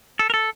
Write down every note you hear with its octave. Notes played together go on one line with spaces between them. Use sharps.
A4
A#4
A4